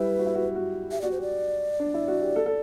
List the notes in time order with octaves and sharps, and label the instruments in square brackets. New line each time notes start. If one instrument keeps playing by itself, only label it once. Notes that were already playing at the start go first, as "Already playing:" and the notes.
Already playing: [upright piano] G3 E4 [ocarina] B4
[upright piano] F#4
E4
F#4
F#4
[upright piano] G4 [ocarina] E5
[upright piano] F#4 [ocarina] D5
[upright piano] G4 [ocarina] C5
[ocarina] D5
[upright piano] D4
E4
F#4
G4
A4
A4